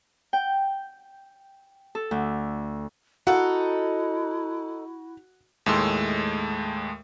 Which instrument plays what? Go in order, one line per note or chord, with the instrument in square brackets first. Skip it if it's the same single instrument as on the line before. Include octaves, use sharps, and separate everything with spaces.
[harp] G5
A4
D2
[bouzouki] D#4 A4 [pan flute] E4 [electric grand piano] F#4 [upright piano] F#5
[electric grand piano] D#2 A2 G#3 A3 C6 E6